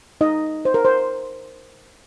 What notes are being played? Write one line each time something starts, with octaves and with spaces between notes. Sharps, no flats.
D#4 D#5
C5
A#4
C5